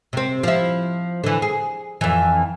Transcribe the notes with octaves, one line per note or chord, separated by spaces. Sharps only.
C3 C4
F3 E4
D3 E3
G#4
F2 E3